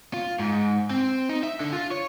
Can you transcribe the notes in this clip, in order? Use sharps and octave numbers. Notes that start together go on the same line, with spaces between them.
F4
G#2
C4
D#4
E5
D3
F4
C#5